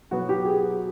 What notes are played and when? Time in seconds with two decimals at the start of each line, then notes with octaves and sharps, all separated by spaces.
0.11 B2 F#3 B3 F#4
0.29 G4
0.46 G#4